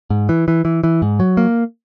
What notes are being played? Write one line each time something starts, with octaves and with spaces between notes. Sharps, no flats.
G#2
E3
E3
E3
E3
G#2
F#3
A#3